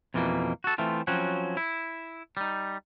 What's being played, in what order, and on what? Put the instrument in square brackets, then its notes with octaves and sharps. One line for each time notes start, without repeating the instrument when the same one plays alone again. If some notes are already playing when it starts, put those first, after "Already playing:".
[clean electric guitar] F2 B2 E3 G3 A#3
F#4 A4
E3 A3 C4 F4
F3 F#3 C4 C#4 F#4
E4
G3 D#4